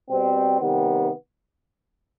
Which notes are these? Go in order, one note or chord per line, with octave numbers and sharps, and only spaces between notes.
B2 G3 C4
C3 D#3 G3 B3